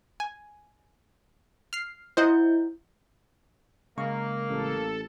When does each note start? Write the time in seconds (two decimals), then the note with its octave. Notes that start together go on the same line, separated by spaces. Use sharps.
0.20 G#5
1.73 F6 C7
2.17 E4 C5 D#5 F#5 G6
3.98 C#3 G#3 A#3 C#6
4.49 A1 A4